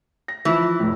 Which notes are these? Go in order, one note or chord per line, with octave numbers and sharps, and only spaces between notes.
A#6
E3 F3
F1 A2